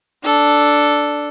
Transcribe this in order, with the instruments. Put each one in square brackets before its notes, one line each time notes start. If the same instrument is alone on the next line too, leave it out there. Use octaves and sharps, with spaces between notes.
[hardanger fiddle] D4 A4